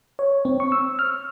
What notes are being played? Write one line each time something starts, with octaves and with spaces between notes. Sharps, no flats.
C#5
C4
C#6
E6
F6